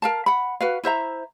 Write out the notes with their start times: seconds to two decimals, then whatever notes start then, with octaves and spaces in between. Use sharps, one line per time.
0.02 A#4 F5 A5
0.26 F#5 B5
0.61 F#4 B4 F5
0.84 E4 C5 E5 A#5